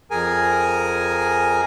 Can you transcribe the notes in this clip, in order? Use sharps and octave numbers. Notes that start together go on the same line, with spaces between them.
F2 G#4 A#4 G#5